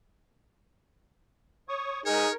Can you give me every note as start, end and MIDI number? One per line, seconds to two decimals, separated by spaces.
1.69 2.01 73
1.69 2.01 85
1.69 2.01 87
2.06 2.27 63
2.06 2.27 68
2.06 2.37 70
2.06 2.32 73